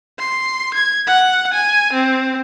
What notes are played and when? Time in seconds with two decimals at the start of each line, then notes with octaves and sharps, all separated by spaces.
0.19 C6
0.74 G#6
1.07 F#5
1.54 G#5
1.93 C4